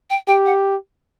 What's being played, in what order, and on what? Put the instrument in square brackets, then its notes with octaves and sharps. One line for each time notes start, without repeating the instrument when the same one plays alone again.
[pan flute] G5
[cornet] G4 [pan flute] G5
[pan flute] F#5